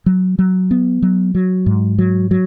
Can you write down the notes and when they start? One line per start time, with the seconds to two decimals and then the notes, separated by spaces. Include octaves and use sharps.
0.06 F#3
0.39 F#3
0.71 B3
1.02 F#3
1.35 F#3
1.66 G#2
1.99 F#3
2.31 F#3